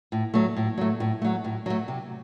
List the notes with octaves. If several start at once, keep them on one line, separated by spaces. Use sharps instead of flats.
A2
F#3 A3
A2
F#3 A3
A2
F#3 A3
A2
F#3 A3
C3